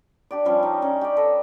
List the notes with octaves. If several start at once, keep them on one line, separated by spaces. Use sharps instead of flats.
D4 G4 D5
F3 G3 C#4
D#4
C#4 D#4
G4 D5
A4 B4 D#5